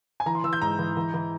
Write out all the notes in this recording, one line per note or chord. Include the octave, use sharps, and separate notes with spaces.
G#5
E3 A#5
C6
E3 E6
G6
G#2 A#5
E3
E3
E3